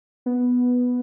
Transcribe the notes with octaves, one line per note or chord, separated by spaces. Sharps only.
B3